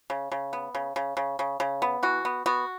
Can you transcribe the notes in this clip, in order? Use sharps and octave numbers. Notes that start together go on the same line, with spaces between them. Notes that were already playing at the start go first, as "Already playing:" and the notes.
C#3
C#3
B3
C#3
C#3
C#3
C#3
C#3
B3
E3 F#4
B3
B3 F#4